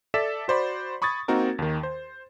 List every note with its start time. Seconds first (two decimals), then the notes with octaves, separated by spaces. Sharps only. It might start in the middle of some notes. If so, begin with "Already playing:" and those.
0.14 A4 D5 E5 A6 B6 E7
0.48 F#4 C5 D5 B5
1.02 B5 C#6 D#6 G#6 A6
1.28 A#3 C4 D#4 F#4 A#4
1.59 D#2 D#3
1.83 C5